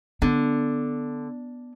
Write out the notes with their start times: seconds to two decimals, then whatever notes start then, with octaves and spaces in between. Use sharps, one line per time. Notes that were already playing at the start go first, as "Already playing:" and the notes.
0.22 D3 B3